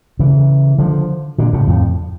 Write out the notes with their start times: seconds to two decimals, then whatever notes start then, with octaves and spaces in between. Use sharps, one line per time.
0.19 C#3 E3
0.78 D3 F3
1.38 A#2 D3
1.53 A2 C#3
1.67 F2 A2